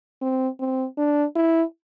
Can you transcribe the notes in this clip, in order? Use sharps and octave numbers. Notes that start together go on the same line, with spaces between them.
C4
C4
D4
E4